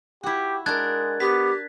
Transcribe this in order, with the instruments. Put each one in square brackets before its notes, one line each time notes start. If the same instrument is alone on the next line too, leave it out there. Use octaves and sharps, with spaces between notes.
[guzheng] E4 F#4 [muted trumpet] G4
[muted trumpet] G#3 [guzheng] D4 F#4 A#4 [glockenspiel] F#6 G#6 A6
[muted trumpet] B3 [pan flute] G4 [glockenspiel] B6